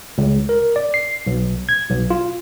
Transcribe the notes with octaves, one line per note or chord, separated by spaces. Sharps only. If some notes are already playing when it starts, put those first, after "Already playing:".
C#2
A#4
D5
C7
B1
G#6
B1
F4